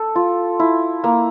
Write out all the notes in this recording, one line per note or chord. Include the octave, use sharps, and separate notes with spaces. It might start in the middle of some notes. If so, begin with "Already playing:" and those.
Already playing: A4
F4
E4
A#3